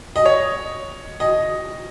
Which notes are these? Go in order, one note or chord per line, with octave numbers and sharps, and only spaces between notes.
D#5
C#5
D#5